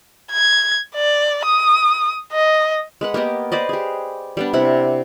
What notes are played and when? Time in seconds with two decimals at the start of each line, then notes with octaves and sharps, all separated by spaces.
0.31 G#6
0.95 D5
1.45 D#6
2.32 D#5
3.01 G#3 B4 F#5
3.14 A#3 B3 G4 D#5
3.52 B4 C5 D5 D#5
3.69 G4 G#4
4.37 G3 B3 D4
4.53 C3 E4 F#5